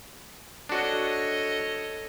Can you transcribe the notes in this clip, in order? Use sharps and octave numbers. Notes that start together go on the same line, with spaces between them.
D4 F#4 A4 C#5 D#5